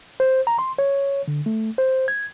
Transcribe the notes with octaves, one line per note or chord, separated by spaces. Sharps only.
C5
A#5
C6
C#5
D3
A3
C5
G#6